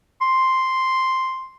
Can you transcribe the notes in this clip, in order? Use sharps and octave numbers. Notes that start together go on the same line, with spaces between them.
C6